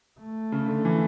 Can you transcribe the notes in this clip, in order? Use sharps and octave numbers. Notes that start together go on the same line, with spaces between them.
A3
C#3
D3
E3